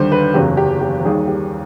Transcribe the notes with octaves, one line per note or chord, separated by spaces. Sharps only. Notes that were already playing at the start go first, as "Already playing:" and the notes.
Already playing: D#2 D3 G3 C5
B4
F#1 E2 C#3 F#3 G4
G4
G4
D#2 D#3 G3 G#4
G4